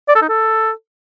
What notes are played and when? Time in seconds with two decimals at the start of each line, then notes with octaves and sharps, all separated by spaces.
0.08 D5
0.15 A4
0.22 D#4
0.29 A4